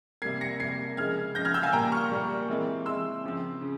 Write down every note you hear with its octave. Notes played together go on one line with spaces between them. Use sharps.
C3 G3 A#3 G#6 C7
A#6 C#7
C3 G3 A#3 G#6 C7
C#3 F3 G#3 F6 G#6
C#3 F3 G#3 G6 A#6
F6 G#6
E6 G6
F5 G#5
A#2 G3 A#3 G5 A#5
C#6 F6
A#2 G3 A#3
E3 G#3 C4
E3 G#3 C4 C6 E6
C#3 F3 C4
C#3